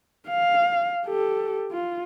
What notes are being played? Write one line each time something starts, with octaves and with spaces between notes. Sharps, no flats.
F5
G4 A4
F4